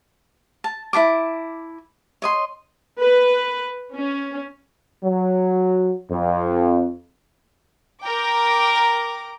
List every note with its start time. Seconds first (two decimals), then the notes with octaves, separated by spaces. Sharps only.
0.64 A5
0.93 E4 C5 A5 D6
2.22 C#5 D#5 C6
2.98 B4
3.94 C#4
5.04 F#3
6.11 F2
8.02 A#4 G5 D6